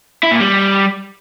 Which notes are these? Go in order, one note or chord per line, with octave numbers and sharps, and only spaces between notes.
E4
A#2
G3